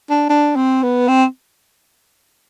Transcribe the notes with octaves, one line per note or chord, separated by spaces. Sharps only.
D4
D4
C4
B3
C4